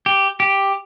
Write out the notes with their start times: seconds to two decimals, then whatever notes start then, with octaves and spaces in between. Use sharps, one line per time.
0.06 G4
0.40 G4